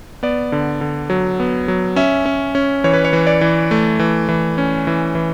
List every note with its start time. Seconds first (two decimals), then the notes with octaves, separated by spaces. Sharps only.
0.23 B3 D5
0.52 D3
0.81 D3
1.10 F#3
1.40 B3
1.68 F#3
1.96 C#4 E5
2.26 C#4
2.55 C#4
2.84 E3 C#5
2.93 B4
3.05 C#5
3.13 E3
3.27 D5
3.41 E3
3.71 A3
3.99 E3
4.29 E3
4.58 C#4
4.87 E3
5.15 E3